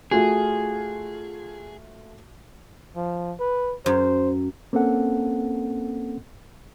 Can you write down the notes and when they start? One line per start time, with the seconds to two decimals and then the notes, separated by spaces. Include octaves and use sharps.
0.11 A3 F4 F#4 G#4
2.96 F3
3.39 B4
3.86 F#2 C5
4.73 A#3 C4 C#4 A4 F#5